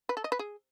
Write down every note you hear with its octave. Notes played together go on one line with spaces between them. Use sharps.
B4
A4
D#5
B4
G#4